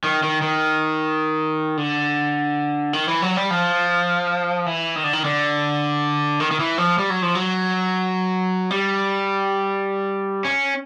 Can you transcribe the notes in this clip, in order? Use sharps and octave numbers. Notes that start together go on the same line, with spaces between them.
D#3
D#3
D#3
D3
D#3
E3
F#3
G3
F3
E3
D#3
D3
D#3
D3
D#3
D#3
E3
F3
G3
F#3
F3
F#3
G3
C#4